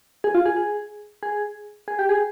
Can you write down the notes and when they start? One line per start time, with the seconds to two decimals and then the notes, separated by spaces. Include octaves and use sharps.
0.24 G#4
0.35 F4
0.46 G#4
0.56 G#4
1.23 G#4
1.88 G#4
1.99 G4
2.09 G#4